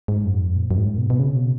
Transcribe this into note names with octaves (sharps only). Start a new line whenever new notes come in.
G#2
F#2
F2
A#2
F#2
G#2
B2
B2
C#3
B2